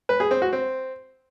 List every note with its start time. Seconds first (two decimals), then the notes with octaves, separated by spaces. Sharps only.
0.09 B4
0.20 G#4
0.31 C4
0.42 F#4
0.53 C4